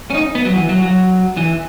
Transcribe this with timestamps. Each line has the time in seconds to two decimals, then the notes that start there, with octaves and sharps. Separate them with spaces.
0.10 C#4
0.14 D#4
0.35 B3
0.45 F#3
0.55 E3
0.69 F#3
0.82 F#3
1.37 E3